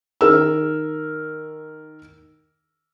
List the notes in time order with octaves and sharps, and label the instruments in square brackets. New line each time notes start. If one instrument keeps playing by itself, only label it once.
[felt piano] D#3 A#4 E6